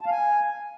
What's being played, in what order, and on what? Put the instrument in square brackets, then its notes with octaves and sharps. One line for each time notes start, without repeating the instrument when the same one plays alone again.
[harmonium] A5
F5
G#5